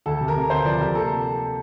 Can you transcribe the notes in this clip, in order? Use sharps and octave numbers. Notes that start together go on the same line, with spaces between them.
D2 A4
C3
A#4
C3
D2 C5
F3 D5
C3 A#4
A#3 A4